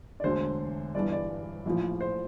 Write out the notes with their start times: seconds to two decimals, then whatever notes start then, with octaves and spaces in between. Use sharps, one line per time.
0.20 D5
0.24 E1 D2 D3 C5
0.95 G1 G2 E3 D5
1.12 D5
1.65 A#1 A2 F3
2.01 C5